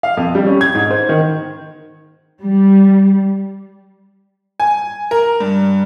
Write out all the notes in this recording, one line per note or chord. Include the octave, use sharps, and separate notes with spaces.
F5
F2
G3
C#4
G#6
G#2
C5
D#3
G3
G#5
A#4
G2